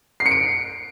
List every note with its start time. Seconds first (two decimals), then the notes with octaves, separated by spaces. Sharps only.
0.20 C7
0.26 C#7
0.31 D7